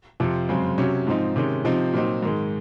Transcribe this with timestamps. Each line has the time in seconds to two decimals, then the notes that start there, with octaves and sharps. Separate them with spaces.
0.20 F2 C3 F3
0.49 F#2 C#3 G#3 C4
0.78 C3 F#3 C#4
1.07 G#2 F3 C4 D#4
1.36 C3 D#3 G#3 C#4
1.65 C3 F3 C4 D#4
1.93 A#2 F#3 C4 D#4
2.22 G#2 D#3 G#3